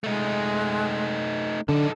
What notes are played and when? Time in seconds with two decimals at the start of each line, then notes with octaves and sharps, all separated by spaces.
0.04 G#3 A3 D#4
1.69 D3 D4 D#4 A4